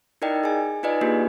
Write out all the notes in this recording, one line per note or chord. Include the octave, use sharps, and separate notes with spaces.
D#4 E4 A#4 D5 D#5 G5
G#4 G#5
D#4 F4 B4 D5 D#5 G#5
A#3 D4 F4 G4 G#4 B4